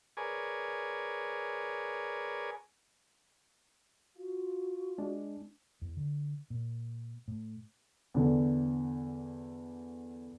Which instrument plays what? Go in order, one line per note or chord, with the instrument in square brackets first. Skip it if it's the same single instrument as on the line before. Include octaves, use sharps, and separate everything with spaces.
[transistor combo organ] G#4 A#4 B4 C#5 D5 G#5
[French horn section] F4 [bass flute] F#4
[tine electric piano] G#3 [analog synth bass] D4
[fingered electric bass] E2
D3
A#2
A2
[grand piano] E2 D3